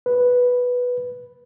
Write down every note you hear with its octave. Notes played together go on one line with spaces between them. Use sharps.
B4